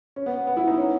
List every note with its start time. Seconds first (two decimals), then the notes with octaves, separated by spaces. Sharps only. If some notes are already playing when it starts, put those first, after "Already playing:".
0.16 C#4
0.26 B3
0.47 B3
0.57 E4
0.67 D#4
0.77 C#4